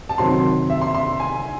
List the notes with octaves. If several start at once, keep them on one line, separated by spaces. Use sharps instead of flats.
A5
C3 D#3 F#3 C4 C6
E5
C6
C6
G#5